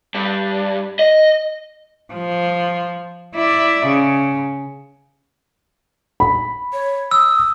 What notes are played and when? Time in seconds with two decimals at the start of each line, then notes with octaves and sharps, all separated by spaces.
0.15 G2
0.99 D#5
2.13 F3
3.35 E4 D5
3.86 C#3
6.20 B5
6.73 C#5
7.11 D#6 E6